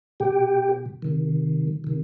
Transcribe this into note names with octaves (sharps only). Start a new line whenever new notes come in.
B2 G4 G5
C3 D#3
C3 D#3